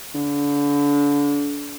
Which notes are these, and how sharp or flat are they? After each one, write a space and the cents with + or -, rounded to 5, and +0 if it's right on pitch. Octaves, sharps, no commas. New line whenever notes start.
D3 -35